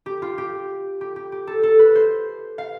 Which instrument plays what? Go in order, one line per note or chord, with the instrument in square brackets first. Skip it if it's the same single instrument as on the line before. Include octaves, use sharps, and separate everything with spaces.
[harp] G4
F4
G4
G4
G4
G4
A4
A4
B4
C5
F5